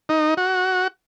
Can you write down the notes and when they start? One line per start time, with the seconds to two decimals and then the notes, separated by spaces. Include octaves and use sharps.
0.09 D#4
0.37 F#4